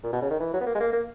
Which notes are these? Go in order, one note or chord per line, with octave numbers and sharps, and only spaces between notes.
A#2
B2
C#3
D#3
E3
F#3
B3
A#3
G#3
A#3
A#3